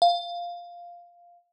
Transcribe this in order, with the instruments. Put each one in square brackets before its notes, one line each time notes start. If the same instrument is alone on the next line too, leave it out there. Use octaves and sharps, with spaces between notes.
[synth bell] F5